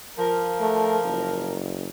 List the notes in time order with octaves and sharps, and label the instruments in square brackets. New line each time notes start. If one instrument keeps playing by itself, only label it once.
[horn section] F3 A#4
[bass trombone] A3
F#1